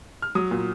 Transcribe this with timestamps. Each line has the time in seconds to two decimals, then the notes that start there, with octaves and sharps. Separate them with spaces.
0.22 F6
0.35 F#3 D#6
0.51 A#2